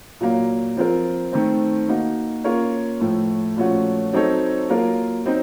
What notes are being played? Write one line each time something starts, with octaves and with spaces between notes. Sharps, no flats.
A#2 F#3 A#3
F3 C4 F4 A#4
D#3 A3 C4
A#3 D#4 F#4
A#3 C#4 F4 A#4 C#5
A2 F3 A3
A#2 F3 A3 C#4 F#4
F#3 C4 D#4 A4 C#5
F#3 A#3 F4 A#4
F#3 C4 D#4